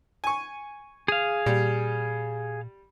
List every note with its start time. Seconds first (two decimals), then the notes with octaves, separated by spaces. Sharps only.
0.24 G#5 C#6
1.08 G#4 F5
1.46 A#2 G3